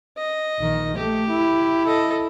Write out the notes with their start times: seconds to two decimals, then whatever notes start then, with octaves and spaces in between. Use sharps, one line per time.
0.18 D#5
0.59 A#1 D#3
0.98 A3 G4
1.30 E4
1.86 A4 D#5